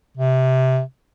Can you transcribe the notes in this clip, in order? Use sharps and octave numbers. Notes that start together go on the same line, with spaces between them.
C3